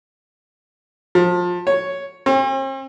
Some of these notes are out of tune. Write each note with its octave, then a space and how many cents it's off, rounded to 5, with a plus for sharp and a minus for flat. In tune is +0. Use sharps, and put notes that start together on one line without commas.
F3 +25
C#5 +0
C4 +45